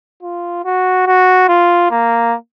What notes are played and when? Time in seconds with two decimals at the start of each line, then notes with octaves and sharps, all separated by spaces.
0.23 F4
0.64 F#4
1.07 F#4
1.48 F4
1.91 A#3